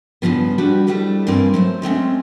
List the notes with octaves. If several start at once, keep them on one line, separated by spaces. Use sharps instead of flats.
G2 A#2 C#3 F3 B3
G3 D4 F#4 G4 B4
F2 G3 A3 D4 E4
G2 E3 A#3 C4 D5 G#5
F#3 A3 C5
G#3 A3 C4 C#4